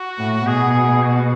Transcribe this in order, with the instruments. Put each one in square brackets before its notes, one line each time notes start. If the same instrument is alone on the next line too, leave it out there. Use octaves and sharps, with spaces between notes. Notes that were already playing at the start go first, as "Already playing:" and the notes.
Already playing: [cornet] F#4
[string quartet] A2
[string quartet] B2 [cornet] G#4
[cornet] F#4